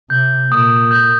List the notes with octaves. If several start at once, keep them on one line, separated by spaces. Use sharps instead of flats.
C3 G6
A#2 D#6
G6